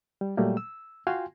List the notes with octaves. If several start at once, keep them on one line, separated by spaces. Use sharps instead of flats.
G3
A#2 F#3 G3 A3 A#3
E6
F4 F#4 F5 G5 G#5 C6